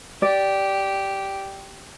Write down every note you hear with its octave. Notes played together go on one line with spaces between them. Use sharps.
G4 D5